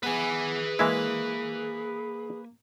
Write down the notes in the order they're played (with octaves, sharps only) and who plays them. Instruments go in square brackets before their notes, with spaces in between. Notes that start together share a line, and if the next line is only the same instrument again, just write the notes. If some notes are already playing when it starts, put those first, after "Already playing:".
[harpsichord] E3 B3 [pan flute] G#4 [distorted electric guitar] B4 G#5
[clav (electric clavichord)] E3 G#3 E4 [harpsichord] A#3